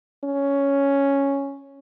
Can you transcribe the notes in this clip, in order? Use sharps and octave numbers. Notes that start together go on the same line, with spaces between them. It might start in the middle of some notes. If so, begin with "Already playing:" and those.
C#4